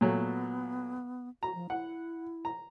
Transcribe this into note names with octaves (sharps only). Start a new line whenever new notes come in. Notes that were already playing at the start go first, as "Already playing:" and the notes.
A#2 F#3 A3 B3
F#4 A#5
F3
E4 F#5
A#5